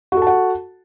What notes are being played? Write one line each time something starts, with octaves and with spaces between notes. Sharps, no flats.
F#4 A4 F#5 A5